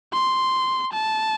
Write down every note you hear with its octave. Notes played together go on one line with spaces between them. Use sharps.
C6
A5